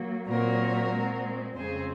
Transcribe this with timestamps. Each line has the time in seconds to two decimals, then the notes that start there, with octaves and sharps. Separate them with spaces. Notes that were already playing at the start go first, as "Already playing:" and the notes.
Already playing: F#3 A#3
0.27 A#2 F#3 C4 F#4 A#4
0.91 A#2 G#3 C4
1.56 F2 C#3 G#3 C4 G#4 C5